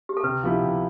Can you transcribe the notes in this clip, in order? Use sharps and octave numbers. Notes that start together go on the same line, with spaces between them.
G4
A4
C3 B4
F3 B3 E4 G4
C3